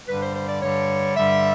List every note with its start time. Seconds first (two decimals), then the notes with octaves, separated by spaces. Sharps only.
0.08 G2 D3 G3 B4
0.21 C5
0.35 C5
0.48 D5
0.62 G2 D3 G3 C#5
1.16 G2 D3 G3 E5